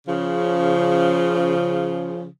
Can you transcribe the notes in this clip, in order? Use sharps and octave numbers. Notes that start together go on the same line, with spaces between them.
C#3 F3